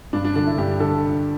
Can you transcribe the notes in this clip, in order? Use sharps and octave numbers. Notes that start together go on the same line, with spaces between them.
G2 D4
D4
D3 D4
E4
G2 G4
D3 A4